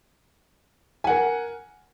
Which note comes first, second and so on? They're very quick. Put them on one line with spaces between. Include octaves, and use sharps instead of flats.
G#5 F#5 A#4